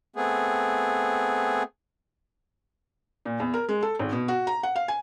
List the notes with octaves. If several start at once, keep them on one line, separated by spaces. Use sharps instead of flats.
A3 B3 C4 G#4
A#2
E2
A#4
G#3
A4
G#1
B2
F#4
A#5
F#5
F5
G#5